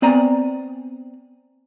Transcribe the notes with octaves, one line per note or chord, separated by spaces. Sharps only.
B3 C4 D5 G#5 A#5